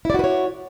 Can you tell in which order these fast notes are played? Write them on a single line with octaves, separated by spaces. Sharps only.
E4 D5 F#4 B4 C#5